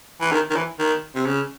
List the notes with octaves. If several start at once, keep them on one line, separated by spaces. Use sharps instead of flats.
E3
D#3
D#3
E3
D#3
C3
C#3